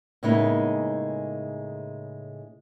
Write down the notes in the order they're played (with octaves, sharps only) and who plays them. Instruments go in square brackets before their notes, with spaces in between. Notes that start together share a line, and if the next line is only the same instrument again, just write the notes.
[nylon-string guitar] A2 C#3 G#3 A#3 B3 D#4